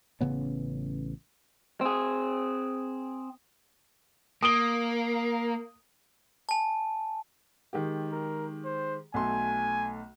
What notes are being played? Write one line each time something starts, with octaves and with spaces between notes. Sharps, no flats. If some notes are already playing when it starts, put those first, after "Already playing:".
A1 C#3 B3 C#4
C4 G#4
A#3 D#6 D7 G7
G#5 A5
D#3 G#3 G4
A#4
C5
B1 A3 G#5 C6